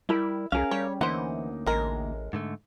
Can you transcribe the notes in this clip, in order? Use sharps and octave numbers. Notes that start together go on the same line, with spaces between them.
G3 E4 A#4 B5
C2 C#4 G#4 A#4 F5
G3 C#5
D2 E3 A#3 D#4 C5 F#5
A1 G#3 A#4
G#2 D3 A3